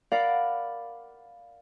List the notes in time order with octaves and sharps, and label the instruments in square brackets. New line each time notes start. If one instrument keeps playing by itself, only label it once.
[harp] A#4 D5 F5 F#5 B5 D6